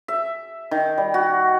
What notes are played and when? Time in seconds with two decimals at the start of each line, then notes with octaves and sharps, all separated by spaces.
0.08 E5
0.71 D#3
0.98 G3
1.14 F#4